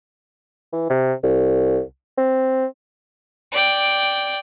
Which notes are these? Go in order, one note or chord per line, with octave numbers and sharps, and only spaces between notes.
E3
C3
C2
C4
D5 G5